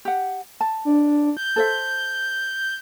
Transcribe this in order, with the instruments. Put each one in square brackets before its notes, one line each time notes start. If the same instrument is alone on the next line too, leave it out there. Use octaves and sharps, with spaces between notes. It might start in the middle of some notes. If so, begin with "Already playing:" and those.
[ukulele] G4 F#5
A5
[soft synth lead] D4
G6
[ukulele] A4 C5 E5